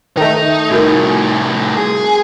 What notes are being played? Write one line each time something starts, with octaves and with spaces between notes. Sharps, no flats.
D#3 A3 D#4
C2 A2 D#4 F#4 A#4
G#4